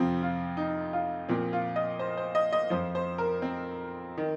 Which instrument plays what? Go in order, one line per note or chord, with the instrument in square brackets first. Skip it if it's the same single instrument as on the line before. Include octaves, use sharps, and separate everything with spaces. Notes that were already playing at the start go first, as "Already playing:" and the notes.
Already playing: [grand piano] F2 C3 F3 C4
F4
D#4
F4
A#2 F3 C4
F4
D#5
C5
C5
D#5
D#5
F2 F3 C5
C5
A#4
C4
D#3